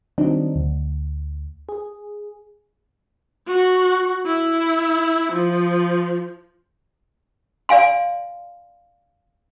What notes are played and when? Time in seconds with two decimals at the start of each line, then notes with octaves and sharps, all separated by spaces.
0.18 D#3 F#3 G3 C4 D4 D#4
0.55 D2
1.69 G#4
3.48 F#4
4.26 E4
5.33 F3
7.69 D5 F5 G#5 C6